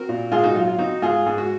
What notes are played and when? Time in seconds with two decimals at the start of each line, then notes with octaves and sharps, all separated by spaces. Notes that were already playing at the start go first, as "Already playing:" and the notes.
Already playing: C4 F#4 A#4
0.09 A#2
0.32 G#2 F4 G#4
0.44 D#4 F#4
0.55 F#3 F4
0.68 F4
0.78 C4 D#4 F#4
1.02 G#2 F4 G#4
1.26 G#2 G#4
1.38 F#4